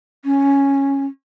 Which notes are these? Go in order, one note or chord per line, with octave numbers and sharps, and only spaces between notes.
C#4